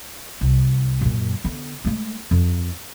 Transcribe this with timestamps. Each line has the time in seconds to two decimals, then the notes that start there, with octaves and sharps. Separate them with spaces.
0.41 C2
1.01 F#2 A#2
1.44 D3 B3
1.85 G#3 A3
2.31 F2